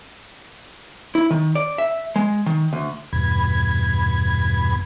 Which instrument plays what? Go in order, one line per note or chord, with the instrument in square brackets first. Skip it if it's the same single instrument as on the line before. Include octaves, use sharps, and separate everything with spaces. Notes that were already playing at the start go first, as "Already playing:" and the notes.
[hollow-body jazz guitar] E4
D#3
D5
E5
G#3
D#3
D2
[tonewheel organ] E2 G2 B2 B5 G#6